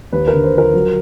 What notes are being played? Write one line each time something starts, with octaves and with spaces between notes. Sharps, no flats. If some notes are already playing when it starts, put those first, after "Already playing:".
D#2 B4
A#4
D3
C5
F3 A#4
F#3